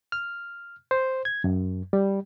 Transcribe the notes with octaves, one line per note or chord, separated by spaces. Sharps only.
F6
C5
G#6
F#2
G3